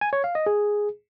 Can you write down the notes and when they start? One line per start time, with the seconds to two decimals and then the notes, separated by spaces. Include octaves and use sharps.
0.01 G#5
0.13 C#5
0.24 F5
0.35 D#5
0.46 G#4